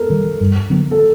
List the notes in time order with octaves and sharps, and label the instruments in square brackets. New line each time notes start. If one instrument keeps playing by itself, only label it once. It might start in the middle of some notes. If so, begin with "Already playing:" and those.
Already playing: [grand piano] A4 A#4
[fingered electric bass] D#3 G3
G2
D3 F#3 B3
[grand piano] A4